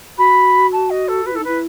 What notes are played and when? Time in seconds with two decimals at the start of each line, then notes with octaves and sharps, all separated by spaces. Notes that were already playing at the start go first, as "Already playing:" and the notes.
0.18 F#4 B5
0.72 A5
0.90 D#5
1.08 A4
1.26 F#4 B4
1.33 E4 A4
1.40 D#4
1.44 E4 B4